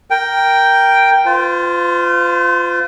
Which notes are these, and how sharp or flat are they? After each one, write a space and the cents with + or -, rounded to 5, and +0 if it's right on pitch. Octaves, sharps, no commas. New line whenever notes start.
A#4 +0 G5 +0
F4 +0 C5 -45